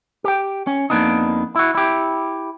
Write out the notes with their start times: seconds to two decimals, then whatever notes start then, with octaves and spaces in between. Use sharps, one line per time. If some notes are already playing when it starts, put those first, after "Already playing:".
0.24 G4 G5
0.67 C#4
0.90 F2 C3 A#3 B3 D4 D#4
1.56 E4 F#4
1.75 E4 G4